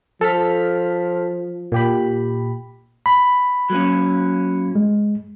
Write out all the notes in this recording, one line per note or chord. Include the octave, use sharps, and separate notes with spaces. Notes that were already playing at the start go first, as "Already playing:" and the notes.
F3 A4 F6 B6
A#2 G4 B5
B5
F#3 A#3 C#4
G#3